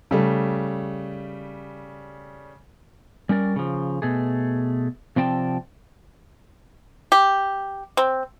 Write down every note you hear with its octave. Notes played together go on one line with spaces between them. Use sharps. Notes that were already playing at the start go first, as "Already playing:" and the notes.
C#3 G3 A3
G3 C#4 A#4 D5
C#3 F3
B2 A3 G#4
C3 F3 C4 D5 G5 A5
G4
C4